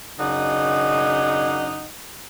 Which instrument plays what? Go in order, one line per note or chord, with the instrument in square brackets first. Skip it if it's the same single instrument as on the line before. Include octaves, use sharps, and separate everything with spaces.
[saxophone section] F#2 C#3 D4 D#4 D#5 F#5